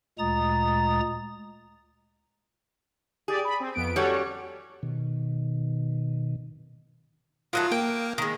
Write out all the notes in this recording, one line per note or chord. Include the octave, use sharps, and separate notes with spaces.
D2 A#2 G#3 A#5 D#6 A6
G4 G#4 D5
B5
C4
F2 B3 D7
G3 C#4 F#4 A4 C#5
B2 D#3
D#3 F#3 A3 F4
A#3 G5
D#3 G#3